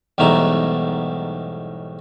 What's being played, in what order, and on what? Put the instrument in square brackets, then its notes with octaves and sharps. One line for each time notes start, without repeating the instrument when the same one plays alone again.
[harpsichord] B1 E2 G#2 G3 A3 A#5